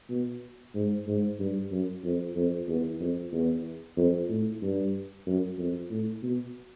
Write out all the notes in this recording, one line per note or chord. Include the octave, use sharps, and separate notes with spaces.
B2
G#2
G#2
G2
F#2
F2
F2
E2
F2
E2
F2
A2
G2
F#2
F2
A2
B2